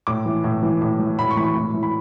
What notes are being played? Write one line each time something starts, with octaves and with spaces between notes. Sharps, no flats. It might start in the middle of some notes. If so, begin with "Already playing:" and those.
A2 D6
E3
A2
E3
A2
E3
A2 B5
C#6
E3 B5
C#6
A2
E3
B5